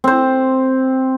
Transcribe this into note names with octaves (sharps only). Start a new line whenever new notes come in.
C4 C5